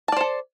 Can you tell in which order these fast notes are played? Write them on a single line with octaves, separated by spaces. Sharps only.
A5 D5 C5 A4